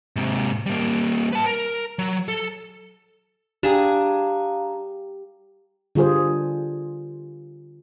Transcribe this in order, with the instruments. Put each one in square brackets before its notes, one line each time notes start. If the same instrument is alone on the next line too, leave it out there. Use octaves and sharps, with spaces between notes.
[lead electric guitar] G#2 C3
G3 A#3
B4 A5
A#4
F#3
A4
[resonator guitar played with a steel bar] D4 G#4 [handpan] G4 [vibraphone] F5 A#5
[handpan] D3 G3 F4 G#4 C5